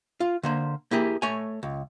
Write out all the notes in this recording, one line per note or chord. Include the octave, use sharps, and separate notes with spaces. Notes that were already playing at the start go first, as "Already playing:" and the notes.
F4
D3 A#3 C5
A#3 E4 G4 G#4
A3 C#5 G#5
C#2